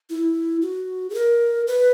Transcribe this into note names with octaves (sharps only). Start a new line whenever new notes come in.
E4
F#4
G#4
A#4
B4